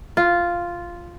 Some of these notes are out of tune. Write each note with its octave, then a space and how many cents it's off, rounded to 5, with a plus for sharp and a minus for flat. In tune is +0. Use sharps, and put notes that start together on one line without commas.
F4 -5